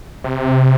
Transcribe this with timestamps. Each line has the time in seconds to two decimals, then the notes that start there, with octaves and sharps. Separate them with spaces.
0.24 C3